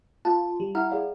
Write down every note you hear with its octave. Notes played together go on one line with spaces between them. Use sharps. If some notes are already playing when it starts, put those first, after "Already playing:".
F4 A5
G3
E4 F#5 A#5 F6
G#4 D5 F5